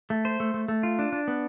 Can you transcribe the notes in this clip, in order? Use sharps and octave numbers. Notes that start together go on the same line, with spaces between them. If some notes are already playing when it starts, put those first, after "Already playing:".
A3
C5
A3
A3
A3
F4
D4
D4
B3